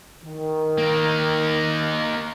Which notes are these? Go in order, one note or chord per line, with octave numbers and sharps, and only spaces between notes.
D#3
A#3 D#4